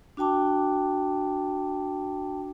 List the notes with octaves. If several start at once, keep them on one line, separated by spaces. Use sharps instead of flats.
D4 F#4 G5 A5 D6